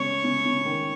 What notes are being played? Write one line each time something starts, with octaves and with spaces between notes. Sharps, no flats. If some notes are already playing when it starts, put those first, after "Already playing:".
Already playing: C#3 G#3 C#5
C#3
C#3
D#3